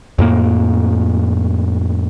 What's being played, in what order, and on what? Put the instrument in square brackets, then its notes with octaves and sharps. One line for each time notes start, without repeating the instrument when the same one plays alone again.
[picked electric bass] F2 A2 A#3